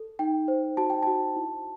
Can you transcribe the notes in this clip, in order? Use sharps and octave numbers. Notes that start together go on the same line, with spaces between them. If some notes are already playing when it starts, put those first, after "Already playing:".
Already playing: A4
D#4 G5
C5
F#4 A5
G5
F#4 A5
E4